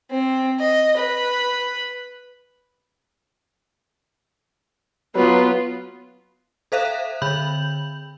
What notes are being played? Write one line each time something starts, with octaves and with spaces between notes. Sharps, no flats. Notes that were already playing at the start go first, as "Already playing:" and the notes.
C4
D#5
B4
F#3 B3 F4 B4
A4 C5 E5 F5 F#6
D3 B5 G6 F#7